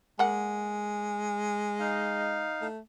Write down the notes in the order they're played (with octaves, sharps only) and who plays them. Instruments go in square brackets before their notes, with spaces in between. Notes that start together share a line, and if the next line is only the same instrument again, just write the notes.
[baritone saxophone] G#3 [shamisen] A#3 F#5
[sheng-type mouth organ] D#4 F5
[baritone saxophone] A3